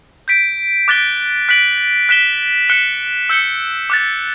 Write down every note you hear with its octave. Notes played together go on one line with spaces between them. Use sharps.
G6 B6 D7
D6 F#6 A6 D7 G7
F#6 B6 D7 F#7
F#6 B6 E7 G7
F#6 C#7 E7 G7
E6 G6 C#7 G7
D6 F#6 A6